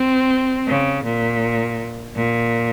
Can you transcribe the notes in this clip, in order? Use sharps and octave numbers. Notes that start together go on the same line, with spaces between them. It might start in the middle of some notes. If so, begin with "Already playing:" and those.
Already playing: C4
C#3
A#2
A#2